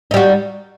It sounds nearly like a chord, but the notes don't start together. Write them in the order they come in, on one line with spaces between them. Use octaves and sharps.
D#4 G3 F#4